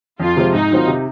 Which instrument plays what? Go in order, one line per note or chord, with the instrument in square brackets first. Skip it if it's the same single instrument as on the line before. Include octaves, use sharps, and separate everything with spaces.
[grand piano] F2 [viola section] F4
[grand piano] C3 F3 G#3 C4
[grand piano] G#2 [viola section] D#4
[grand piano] D#3 F#3 C4 F4
C3